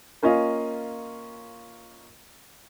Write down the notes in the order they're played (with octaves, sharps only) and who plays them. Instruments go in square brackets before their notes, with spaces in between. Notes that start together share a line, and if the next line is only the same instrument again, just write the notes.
[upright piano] A#3 C#4 F4 D#5 F5